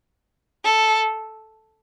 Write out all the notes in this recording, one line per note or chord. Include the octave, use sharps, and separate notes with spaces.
A4